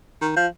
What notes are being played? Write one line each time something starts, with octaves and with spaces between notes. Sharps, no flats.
D#3
F3